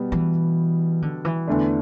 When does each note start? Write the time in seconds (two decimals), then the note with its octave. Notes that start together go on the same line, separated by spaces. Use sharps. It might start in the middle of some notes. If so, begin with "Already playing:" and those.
Already playing: B2 G3 B3 F#4
0.12 E3
1.02 D3
1.25 E3
1.48 E2 D3 A3 D4